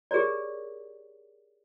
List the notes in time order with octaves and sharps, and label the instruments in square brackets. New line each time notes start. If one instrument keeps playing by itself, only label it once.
[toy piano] G4 G#4 A#4 C#5 D5